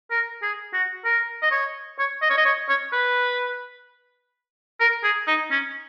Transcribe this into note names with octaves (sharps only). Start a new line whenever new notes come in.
A#4
G#4
F#4
A#4
D#5
C#5
C#5
D#5
C#5
D#5
C#5
C#5
B4
A#4
G#4
D#4
C#4